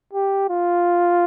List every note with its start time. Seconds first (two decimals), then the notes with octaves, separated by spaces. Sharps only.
0.13 G4
0.50 F4